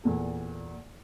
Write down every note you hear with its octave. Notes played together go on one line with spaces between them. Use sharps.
E2 A#2 A4